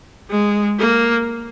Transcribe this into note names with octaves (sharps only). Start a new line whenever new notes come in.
G#3
A#3